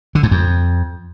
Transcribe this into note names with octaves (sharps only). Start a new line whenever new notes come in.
D3
G#2
F2